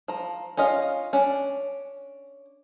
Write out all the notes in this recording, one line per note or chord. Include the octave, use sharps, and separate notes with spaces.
F3 A#5
C#4 F4 D#5 F5
C#4 D4